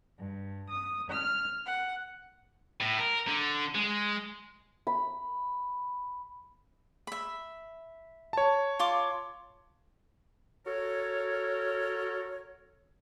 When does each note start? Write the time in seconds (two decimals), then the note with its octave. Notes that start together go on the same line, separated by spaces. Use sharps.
0.17 G2
0.70 D#6
1.09 F6
1.65 F#5
2.81 A2
2.99 A#4
3.28 D3
3.75 G#3
4.87 B5
7.07 E5 B5
8.33 C#5 A5
8.79 F4 C6 D6
10.67 F#4 A4 A#4 C#5